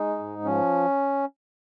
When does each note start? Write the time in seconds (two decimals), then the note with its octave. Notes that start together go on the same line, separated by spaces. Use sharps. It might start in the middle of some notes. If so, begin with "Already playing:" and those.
Already playing: G#3 D#4
0.19 G#2
0.44 F3 C#4